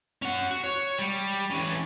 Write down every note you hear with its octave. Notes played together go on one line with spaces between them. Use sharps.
C#4 F#5
F#4
C#5
G3
E3 C#4